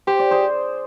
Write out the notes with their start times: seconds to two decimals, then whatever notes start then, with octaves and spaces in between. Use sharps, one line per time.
0.07 G4 C5
0.19 D5
0.31 G#4 C5